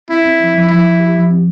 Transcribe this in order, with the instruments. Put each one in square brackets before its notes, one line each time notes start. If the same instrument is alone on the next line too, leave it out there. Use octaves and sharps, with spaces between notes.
[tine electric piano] C4 [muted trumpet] E4
[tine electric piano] C4
F3
F3
[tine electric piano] F3 [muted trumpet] E4
[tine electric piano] F3
G4
F3
C4